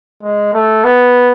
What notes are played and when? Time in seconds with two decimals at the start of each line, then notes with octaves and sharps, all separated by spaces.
0.22 G#3
0.53 A3
0.84 B3